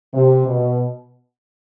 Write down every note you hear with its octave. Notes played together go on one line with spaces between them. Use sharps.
C3
B2